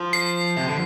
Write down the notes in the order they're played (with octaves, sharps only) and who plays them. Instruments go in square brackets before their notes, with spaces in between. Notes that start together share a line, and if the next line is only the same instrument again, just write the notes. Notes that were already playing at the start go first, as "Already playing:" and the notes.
Already playing: [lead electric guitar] F3
[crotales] C7
[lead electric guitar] C3
D3